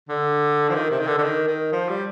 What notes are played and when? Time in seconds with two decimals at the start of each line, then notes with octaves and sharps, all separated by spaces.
0.09 D3
0.69 F3
0.74 D#3
0.90 C3
0.99 D#3
1.07 D3
1.18 D3
1.23 D#3
1.47 D#3
1.72 F3
1.89 G3